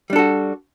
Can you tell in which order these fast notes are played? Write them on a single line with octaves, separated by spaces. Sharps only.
G3 D4 A4 F#4